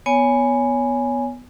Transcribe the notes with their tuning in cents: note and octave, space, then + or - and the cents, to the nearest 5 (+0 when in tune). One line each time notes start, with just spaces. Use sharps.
B3 +0 C#5 +20 G#5 +0